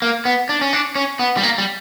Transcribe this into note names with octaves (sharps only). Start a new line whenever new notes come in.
A#3
B3
D4
C#4
D4
C#4
B3
G3
A#3
G3